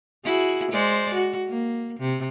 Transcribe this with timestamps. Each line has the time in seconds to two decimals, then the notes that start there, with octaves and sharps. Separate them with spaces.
0.25 E4 F#4 G#4
0.72 G#3 C5 D5
1.14 F#4
1.48 A#3
2.00 C3